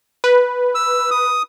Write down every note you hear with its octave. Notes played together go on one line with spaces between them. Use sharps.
B4
E6
D#6